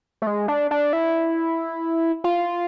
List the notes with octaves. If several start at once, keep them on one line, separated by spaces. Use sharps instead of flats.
A3
G#3
D4
D4
E4
F4